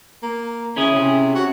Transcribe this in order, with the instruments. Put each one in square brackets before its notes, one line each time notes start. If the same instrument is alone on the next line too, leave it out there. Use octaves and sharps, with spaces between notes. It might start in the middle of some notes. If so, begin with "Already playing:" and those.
[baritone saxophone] A#3
[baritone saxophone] C#3 [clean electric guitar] C#4 E4 G#4
[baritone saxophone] C3
F#4